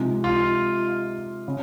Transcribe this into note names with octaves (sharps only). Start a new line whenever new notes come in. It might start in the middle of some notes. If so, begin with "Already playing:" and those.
Already playing: C3 F3 G#3 D#4
F4
C#3